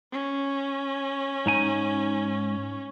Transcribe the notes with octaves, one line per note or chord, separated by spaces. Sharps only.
C#4
G#2 D#4 G#5